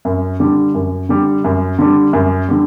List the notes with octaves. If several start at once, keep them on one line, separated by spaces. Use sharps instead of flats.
F#2
D3 G3
F#2
D3 G3
F#2
D3 G3
F#2
D3 G3